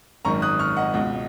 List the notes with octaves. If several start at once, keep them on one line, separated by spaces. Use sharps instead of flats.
G#1 F#2 D#3 A#5 C#6
D#6 F#6
C#6 F6
D#5 F#5
C#2 B2 D#5 F#5